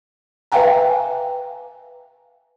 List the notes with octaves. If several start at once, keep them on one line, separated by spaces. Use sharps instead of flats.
B4 E5 F5 G5 G#5 A#5